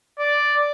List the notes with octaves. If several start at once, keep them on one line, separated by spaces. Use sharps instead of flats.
D5